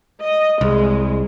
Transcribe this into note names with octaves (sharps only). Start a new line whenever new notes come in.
D#5
C2 G#3